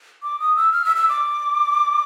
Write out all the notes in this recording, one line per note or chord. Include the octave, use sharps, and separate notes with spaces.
D6
D#6
E6
F6
E6
E6
D6